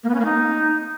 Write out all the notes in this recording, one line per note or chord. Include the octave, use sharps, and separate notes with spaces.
A#3
B3
C#4
A#3
D#4